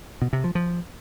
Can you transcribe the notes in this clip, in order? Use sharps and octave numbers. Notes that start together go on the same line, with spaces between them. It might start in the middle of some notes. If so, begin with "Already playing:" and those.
B2
C3
F3
F3